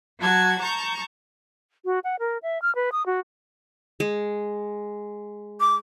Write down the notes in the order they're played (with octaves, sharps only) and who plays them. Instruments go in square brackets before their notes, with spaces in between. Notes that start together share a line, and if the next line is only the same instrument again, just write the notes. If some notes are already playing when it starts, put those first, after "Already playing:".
[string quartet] F#3 F#4 A5 G#6
A5 A#5 C#6 G6
[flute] F#4
F#5
A#4
E5
F6
B4
D#6
F#4
[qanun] G#3
[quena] D6